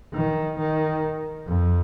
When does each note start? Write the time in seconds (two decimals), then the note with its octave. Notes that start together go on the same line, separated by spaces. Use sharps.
0.13 D#3
0.58 D#3
1.47 F2